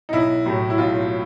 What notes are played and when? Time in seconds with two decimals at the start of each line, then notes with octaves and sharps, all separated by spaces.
0.09 D#4
0.13 B1 E4
0.46 A2 F#3 A3
0.70 E4
0.78 B1 F4